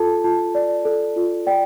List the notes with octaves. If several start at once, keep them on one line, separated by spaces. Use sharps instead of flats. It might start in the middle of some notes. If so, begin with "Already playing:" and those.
Already playing: F4 A4 A5
F4 A5
D5
A4
F4
D5 G5